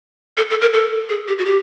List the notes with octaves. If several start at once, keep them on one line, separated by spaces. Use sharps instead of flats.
A4
A4
A#4
A4
G#4
G4
F#4
G4